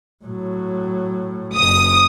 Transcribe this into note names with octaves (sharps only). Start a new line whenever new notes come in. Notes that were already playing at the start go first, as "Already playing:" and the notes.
A2 F#3
F#1 D#6